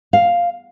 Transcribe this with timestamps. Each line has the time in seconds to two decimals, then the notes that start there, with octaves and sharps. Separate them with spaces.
0.13 F5